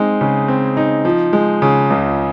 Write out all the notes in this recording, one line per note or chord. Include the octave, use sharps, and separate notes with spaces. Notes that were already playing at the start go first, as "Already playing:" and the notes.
Already playing: G#3 C4 D#4
C#3
C4
D#4
F3
G#3
C#3
C#2